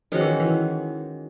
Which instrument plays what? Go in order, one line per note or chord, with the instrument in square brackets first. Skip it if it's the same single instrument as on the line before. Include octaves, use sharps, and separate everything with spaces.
[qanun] D#3 G#3 C#4 F#4 [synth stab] F3
[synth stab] E3
E3